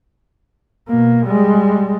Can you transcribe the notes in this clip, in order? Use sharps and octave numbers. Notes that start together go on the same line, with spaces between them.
B2 A#3
G3 G#3